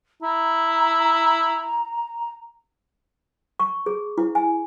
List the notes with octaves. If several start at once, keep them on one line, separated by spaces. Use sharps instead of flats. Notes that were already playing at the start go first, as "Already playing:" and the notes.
E4 A#5
C#6
G#4
E4
G#5